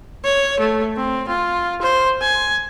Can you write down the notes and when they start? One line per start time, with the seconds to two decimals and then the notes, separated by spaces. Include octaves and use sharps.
0.24 C#5
0.60 A3
0.97 C4
1.28 F4
1.82 C5
2.22 G#5